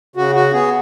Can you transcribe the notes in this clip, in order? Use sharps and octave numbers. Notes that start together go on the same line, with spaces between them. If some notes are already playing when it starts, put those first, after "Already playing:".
C#3 F#4
F#4
B3 G#4